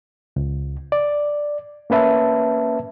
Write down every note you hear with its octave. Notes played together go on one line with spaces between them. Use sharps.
C#2
D5
A#3 C#4 B4 E5 A5